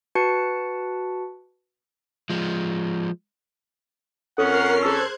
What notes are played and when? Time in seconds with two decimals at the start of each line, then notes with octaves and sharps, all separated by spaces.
0.15 F#4 B4 A5 C#7
2.30 F3 G#3
4.38 F2 C#4 A4 A#4 F#5 F6 C7
4.82 G#4 A4 C5 E6 F#6 G#6